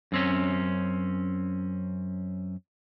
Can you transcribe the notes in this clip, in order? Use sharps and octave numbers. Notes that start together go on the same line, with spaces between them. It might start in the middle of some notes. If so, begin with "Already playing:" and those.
F#2 C4 C#4